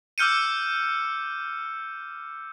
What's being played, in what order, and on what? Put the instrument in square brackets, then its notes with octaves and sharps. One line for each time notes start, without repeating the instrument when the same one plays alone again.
[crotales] D6 E6 F6 G6 C#7 D#7